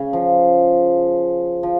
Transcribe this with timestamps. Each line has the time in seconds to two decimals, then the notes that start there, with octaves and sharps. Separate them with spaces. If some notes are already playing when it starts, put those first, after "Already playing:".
Already playing: C#3
0.13 F3
1.63 F3